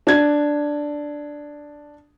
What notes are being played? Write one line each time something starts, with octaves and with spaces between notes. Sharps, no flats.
D4 G#6